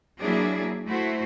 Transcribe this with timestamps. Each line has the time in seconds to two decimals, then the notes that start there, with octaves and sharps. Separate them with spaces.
0.21 F#3 A#3 D4 E4 G#4
0.86 A3 E4 F#4 C5